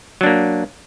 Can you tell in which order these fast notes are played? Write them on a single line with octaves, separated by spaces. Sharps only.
F#3 D4 A#3